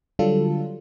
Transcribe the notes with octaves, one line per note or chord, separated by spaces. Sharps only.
D3 F#3 G3 D4 F4 A4